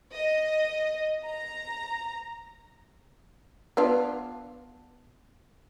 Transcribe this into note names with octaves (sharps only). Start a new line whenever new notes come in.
D#5
A#5
B3 D4 F4